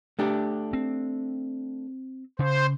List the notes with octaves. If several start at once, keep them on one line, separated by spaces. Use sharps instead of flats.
A3 D4 G4
C4
C#3 C5